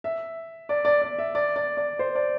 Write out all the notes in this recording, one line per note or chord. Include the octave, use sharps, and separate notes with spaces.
E5
D5
D5
D5
E5
D5
D5
D5
C5
D5